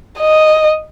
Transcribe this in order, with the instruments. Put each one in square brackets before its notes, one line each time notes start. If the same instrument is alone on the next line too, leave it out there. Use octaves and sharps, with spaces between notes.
[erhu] D#5